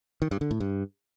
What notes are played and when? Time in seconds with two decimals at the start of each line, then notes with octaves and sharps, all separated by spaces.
0.22 D#3
0.31 G2
0.41 D3
0.51 A2
0.60 G2